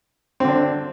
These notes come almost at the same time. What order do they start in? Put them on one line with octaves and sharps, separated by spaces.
C4 D3 D4